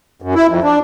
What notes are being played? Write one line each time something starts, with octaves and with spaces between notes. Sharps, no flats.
F#2
E4
F2
D4